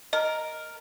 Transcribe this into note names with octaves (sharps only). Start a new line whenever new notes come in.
A#4 D#5